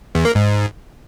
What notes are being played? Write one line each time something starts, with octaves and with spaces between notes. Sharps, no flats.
E2
A#3
G#2